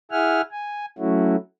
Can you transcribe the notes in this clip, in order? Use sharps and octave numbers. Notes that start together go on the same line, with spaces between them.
E4 G#4 E5 F#5 G#5 F6
G#5
F#3 A3 C#4 E4 F#4